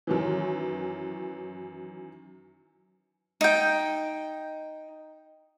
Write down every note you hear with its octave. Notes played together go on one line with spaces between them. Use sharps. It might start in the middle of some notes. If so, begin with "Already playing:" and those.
F#2 D#3 E3
D#4 G5